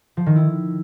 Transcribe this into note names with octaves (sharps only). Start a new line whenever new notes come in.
F3
D#3
E4